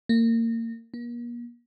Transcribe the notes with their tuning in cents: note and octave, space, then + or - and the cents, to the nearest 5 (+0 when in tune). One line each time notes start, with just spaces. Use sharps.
A#3 -30
A#3 +40